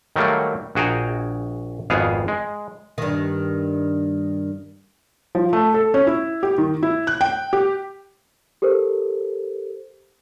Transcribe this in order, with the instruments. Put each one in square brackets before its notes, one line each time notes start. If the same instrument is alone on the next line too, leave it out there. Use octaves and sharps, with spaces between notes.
[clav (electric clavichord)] D#3 F#3 G3 A3 A#3
A#1 F#4 G#4 G5 A#5
G#1 F2 B3 G#4 F5
G#3
[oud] G2 D#3
[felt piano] F3
A3
A4
C#4
E4
G4
D#3
E4
F#6
G5
G4
[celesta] G4 A4 A#4 C5